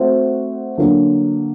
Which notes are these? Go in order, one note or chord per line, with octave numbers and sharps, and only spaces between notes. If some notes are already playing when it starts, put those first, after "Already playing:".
Already playing: A3 C4 F#4 C5
D3 F#3 A#3 F#4 A4